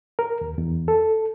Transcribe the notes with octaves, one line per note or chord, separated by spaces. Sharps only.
A#4
D#2
E2
A4